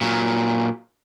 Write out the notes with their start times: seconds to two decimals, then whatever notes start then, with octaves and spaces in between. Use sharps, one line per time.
0.01 A#2 F#3